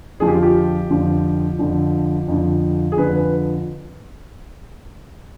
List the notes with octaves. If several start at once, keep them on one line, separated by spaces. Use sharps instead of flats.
F2 D3 F3 G#4
G4
F4
G4
F2 D3 F3
F2 D3 F3
F2 D3 F3
G#4
F2 D3 F3 B4
B4